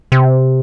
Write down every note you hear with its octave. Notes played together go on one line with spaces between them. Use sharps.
C3